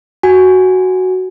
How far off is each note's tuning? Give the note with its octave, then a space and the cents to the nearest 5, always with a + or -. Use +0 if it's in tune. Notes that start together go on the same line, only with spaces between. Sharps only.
F#4 +5 G#5 +0